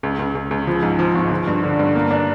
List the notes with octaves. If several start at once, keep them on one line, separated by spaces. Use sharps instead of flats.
C#2
C#2
C#2
C#2
F3
G#2
F3
G#1
F3
G2
D3
G2
A#3
D4